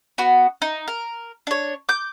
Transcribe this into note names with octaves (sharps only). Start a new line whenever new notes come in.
B3 F#4
D#4
A#4
D4 C#5
D6 G6